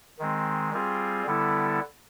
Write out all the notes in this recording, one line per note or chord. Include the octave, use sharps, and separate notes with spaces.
D#3 G#3 C4
G3 C4 F4 G#4
D3 G3 B3 E4 A4